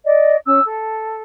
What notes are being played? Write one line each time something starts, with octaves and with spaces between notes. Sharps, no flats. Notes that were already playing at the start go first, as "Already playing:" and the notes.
D5 D#5
C#4 E6
A4